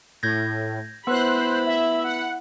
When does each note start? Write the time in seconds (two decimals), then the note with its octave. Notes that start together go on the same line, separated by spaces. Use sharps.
0.23 A2 G6 G#6 A#6
1.07 B3 E4 B4 C5 B5 F#6
1.66 E5
2.04 F#5